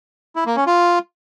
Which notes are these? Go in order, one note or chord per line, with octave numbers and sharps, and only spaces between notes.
E4
A#3
C#4
F4